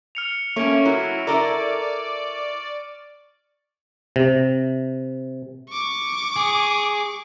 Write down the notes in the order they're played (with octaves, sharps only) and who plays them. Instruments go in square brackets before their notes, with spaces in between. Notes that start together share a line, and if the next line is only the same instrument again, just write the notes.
[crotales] F6 C#7 F7
[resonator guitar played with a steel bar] A3 C#5 [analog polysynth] A#3 C#4 [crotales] C#6 D7
[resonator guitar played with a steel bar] F#3 [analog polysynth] E4
[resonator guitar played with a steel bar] E4 A4 A#4 [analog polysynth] D5
[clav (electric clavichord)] C3
[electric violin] C#6 D6
[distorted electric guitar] G#4